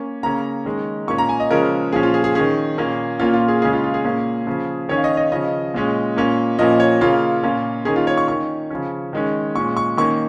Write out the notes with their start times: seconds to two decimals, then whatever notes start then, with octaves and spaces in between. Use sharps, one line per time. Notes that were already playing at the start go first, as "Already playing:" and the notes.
Already playing: A#3 C#4
0.23 C#3 A#3 C#4 A#5
0.65 D#3 G#3 C#4
1.08 A#2 A#3 C#4 C#6
1.18 A#5
1.29 G#5
1.40 D#5
1.50 C#3 F3 G#3 C#4 A#4
1.92 A#2 F3 C#4 G#4
2.03 F4
2.14 G#4
2.24 G#4
2.35 D#3 C#4 G#4
2.78 A#2 A#3 C#4
3.19 A#2 A#3 C#4 F4
3.34 F4
3.48 G#4
3.62 C#3 G#3 C#4 G#4
3.73 F4
3.84 F4
3.94 G#4
4.05 A#2 A#3 C#4
4.47 C#3 F3 C#4
4.89 D#3 C#4 C#5
4.97 F5
5.04 D#5
5.17 D#5
5.32 C#3 F3 C#4 D#5
5.74 A#2 G#3 C#4
6.17 A#2 A#3 C#4
6.59 A#2 F3 A#3 C#4 D#5
6.80 C#5
7.01 C#3 A#3 C#4 F4
7.43 A#2 A#3 C#4
7.85 D#3 A#3 C#4 G#4
7.96 F4
8.07 C#5
8.17 C#6
8.28 D#3 C#4 C#6
8.71 C#3 F3 C#4
9.13 D#3 G#3 C#4
9.55 A#2 G#3 C#4 C#6
9.77 C#6
9.97 D#3 A#3 C#4 C#6